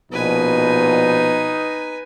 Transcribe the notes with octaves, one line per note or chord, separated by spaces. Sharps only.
A#1 B2 D#4 B4 G#5